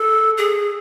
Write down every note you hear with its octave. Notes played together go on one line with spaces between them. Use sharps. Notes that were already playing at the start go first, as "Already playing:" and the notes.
Already playing: A4
G#4